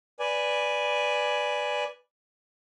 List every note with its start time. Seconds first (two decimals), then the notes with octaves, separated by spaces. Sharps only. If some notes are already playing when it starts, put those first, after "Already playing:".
0.20 B4 D5 G#5